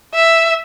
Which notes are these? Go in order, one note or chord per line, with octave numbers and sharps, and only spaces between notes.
E5